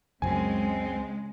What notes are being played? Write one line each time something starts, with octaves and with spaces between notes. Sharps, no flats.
C#2 F#2 C#3 G#3 C4 G#5